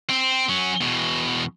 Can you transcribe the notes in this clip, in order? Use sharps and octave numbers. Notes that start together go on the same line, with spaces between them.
C4
F#3 C#4
E2 B2